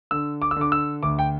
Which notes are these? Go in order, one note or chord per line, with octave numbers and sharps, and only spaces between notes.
D3 E6
D6
E6
D3 D6
E6
D2 D6
G5